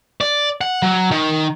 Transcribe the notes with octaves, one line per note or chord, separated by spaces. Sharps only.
D5
F#5
F#3
D#3